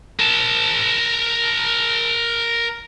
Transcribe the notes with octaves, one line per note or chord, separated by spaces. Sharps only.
A#4 A5